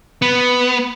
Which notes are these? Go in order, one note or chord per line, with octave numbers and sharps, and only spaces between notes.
B3